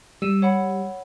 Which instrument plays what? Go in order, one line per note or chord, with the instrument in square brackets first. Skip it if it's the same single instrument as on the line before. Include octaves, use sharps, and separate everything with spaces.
[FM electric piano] G3 [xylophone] E6 D#7 E7
[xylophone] C#5 F#5 B5